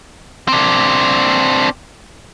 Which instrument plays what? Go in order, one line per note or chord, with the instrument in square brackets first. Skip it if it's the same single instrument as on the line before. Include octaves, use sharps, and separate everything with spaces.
[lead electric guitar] C4 D4